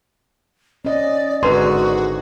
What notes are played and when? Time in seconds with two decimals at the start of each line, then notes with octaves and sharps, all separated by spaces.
0.85 C#4 D5 D#5
1.43 G#1 D3 F#4 G#4 B4 A#5 C6